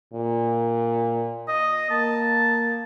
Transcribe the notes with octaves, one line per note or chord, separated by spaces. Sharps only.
A#2
D#5
A#3 A5